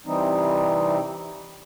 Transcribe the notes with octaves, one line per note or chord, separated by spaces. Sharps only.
C3 E3 G3 C4 D#4